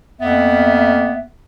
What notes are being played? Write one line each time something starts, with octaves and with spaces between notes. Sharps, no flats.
F2 A#3 B3 E5